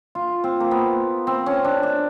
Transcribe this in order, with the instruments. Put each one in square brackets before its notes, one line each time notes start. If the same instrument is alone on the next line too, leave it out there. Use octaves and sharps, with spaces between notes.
[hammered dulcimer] F4
C4
A#3
B3
C4
C#4
D4
D4